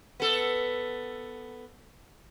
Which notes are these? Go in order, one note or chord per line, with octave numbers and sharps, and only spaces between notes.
B3 A4